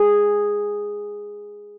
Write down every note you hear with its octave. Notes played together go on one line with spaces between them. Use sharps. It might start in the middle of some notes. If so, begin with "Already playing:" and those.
Already playing: G#4